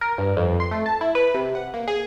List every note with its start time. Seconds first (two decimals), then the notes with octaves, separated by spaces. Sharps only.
0.01 A#4
0.18 G2
0.37 F2
0.60 C6
0.71 A3
0.86 A5
1.01 E4
1.15 B4
1.34 C3
1.55 F#5
1.74 A#3
1.88 G#4